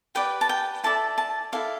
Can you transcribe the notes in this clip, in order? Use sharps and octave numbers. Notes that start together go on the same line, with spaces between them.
G4 B4 D5 G5
A5
G5
E4 A4 D5 A5
A5
E4 A4 D5 F5